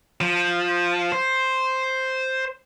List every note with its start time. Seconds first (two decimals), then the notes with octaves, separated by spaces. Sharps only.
0.21 F3
1.12 C5